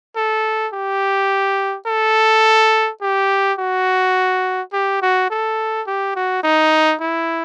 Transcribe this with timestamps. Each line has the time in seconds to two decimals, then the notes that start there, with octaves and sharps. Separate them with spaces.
0.16 A4
0.73 G4
1.87 A4
3.02 G4
3.59 F#4
4.73 G4
5.02 F#4
5.30 A4
5.87 G4
6.16 F#4
6.43 D#4
7.01 E4